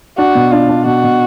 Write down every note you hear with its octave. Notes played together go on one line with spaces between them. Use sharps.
D4 F#4
B2
D4 F4
D4
B2 F#4
B2